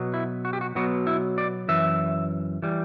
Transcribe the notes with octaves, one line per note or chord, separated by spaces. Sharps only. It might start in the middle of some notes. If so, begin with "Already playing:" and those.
Already playing: B2 F#3 B3
E4
F#4
G4
F#4
B2 F#3 B3 F#4
E4
D5
F#2 E3 E5
E3 G3